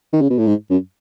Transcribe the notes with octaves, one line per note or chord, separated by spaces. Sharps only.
D#3
C#3
B2
A2
G#2
F#2